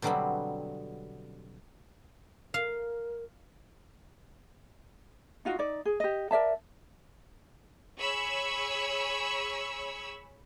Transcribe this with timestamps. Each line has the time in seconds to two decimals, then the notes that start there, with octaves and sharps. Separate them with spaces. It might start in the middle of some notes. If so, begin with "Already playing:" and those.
0.02 B2 D3 F#3 G3 B3 C4
2.54 A#4 F5
5.45 D#4 F4 F#4
5.59 D#4 D5
5.85 G#4
6.00 G4 D#5
6.31 A#4 D5 E5 A5
7.97 G#4 C#5 B5 C#6 E6